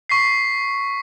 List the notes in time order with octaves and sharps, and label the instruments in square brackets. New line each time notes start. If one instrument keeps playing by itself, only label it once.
[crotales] C#6 B6 C7